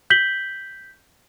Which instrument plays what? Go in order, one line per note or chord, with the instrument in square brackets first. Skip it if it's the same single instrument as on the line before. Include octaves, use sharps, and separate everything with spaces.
[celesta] G6 B6 F#7 G7